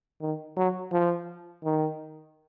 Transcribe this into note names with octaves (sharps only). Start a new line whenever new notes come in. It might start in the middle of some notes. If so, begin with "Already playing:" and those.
D#3
F#3
F3
D#3